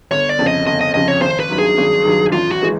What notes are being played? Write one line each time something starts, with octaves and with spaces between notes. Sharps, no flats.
G1 C#5
D5
F2 C#3
D#5
G1 D#5
D#5
F2 C#3 D#5
C#5
G#1 C5
B4
G2 D#3 F#3
G#4
G#1
G2 D#3 F#3
A1 F4
F#4
E3 G#3